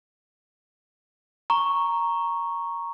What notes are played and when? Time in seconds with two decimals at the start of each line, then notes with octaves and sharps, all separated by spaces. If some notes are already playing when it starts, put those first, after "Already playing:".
1.50 A#5 C#6